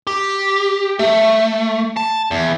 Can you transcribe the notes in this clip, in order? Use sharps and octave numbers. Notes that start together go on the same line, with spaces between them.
G4
A3
A5
E2